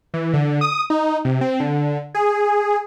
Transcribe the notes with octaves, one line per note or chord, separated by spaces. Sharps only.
E3
D3
D#6
D#4
C3
C4
D3
G#4